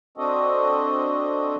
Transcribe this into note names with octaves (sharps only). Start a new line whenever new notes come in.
C4 D4 F#4 A4 D#5